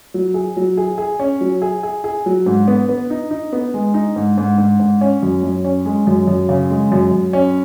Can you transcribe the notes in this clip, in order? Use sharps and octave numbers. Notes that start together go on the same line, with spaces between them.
F#3
G#4
F#3
G#4
G#4
C#4
F#3
G#4
G#4
G#4
F#3
G#2
B3
B3
D#4
D#4
B3
G#3
D#4
G#2
G#2
G#2
G#2
C#4
F#2
F#2
C#4
G#3
F#2
F#2
C#3
G#3
F#2
F#2
C#4